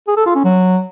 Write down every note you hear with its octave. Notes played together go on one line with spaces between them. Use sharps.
G#4
A4
F4
C#4
F#3